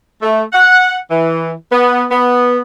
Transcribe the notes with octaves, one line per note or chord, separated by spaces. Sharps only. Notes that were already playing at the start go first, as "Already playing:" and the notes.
A3
F#5
E3
B3
B3